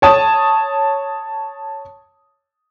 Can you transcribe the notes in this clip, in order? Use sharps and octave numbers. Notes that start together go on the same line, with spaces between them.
C#5 A5 D#6